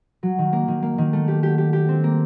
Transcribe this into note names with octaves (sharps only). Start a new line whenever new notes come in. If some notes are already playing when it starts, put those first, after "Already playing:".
F#3
D#3
A#3
D#3
A#3
D#3
A3
G4
G4
G4
G4
C4
A#3